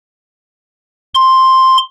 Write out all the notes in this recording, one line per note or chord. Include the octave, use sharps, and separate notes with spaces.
C6